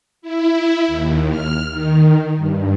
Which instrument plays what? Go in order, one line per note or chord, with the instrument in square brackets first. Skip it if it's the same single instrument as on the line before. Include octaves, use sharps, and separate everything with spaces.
[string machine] E4
D#2
F6
D#3
G2